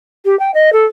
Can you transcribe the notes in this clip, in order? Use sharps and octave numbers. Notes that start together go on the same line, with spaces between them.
G4
G5
D#5
A4